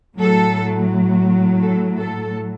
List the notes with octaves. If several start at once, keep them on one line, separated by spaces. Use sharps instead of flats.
A2 F#3 A4
A4
A4